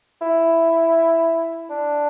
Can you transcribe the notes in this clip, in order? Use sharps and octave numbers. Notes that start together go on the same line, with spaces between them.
E4
D4